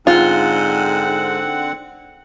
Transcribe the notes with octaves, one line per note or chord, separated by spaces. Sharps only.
G#2 D3 C4 F4 F#5